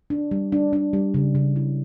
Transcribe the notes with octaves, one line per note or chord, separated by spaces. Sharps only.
D4
G3
D4
D4
G3
C#3
C#3
E4